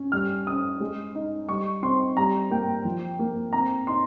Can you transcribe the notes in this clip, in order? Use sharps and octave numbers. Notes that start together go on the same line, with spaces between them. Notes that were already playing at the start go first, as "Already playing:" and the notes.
Already playing: C#4
G3 F6
C#4 D#6
G#3
D#4
G3 C#6
C4 C6
G3 A#5
A#3 G5
F3
A#3
C4 A#5
D#4 C6